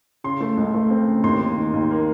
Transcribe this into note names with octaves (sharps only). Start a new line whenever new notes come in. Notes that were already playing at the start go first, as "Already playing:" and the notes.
C#3 C6
A3
C#2
A3
C4
C#3
D#2 C6
D#3
D#3
D#2
A#3